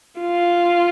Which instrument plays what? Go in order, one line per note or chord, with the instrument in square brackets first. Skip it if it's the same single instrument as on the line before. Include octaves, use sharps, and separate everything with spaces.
[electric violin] F4